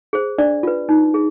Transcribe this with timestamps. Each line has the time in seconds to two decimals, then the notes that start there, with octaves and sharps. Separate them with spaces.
0.13 G#4 C5
0.38 D4 D5
0.63 F4 B4
0.89 D#4
1.14 G#4